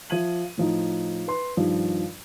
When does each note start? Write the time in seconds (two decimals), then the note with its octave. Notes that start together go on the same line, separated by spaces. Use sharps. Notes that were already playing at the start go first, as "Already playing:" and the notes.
0.10 F3 E5 G#6 D#7 F#7
0.58 A2 F3 D#4
1.28 B4 C6
1.57 G2 D#3 F3